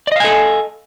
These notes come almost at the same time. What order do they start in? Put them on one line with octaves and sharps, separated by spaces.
D5 D#5 F5 G#5 A4